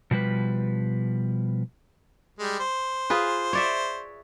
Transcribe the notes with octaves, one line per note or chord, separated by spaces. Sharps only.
B2 F3 G3 B4
G3 G#3
C5
F4 G#4 B4
C#5 D5 E5